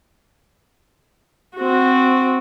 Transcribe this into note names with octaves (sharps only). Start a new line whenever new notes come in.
C4 F#4